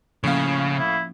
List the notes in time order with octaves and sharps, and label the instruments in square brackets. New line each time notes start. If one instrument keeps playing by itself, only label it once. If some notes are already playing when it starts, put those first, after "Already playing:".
[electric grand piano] A2 F5 [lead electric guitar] C#3 [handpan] F3 A#3 C#4
[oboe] E4